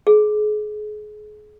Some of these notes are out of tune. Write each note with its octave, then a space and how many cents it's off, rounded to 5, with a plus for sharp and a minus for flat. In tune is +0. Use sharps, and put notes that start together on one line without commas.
G#4 +30